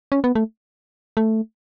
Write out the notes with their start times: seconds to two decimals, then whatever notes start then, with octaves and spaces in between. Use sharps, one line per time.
0.12 C#4
0.24 B3
0.35 A3
1.17 A3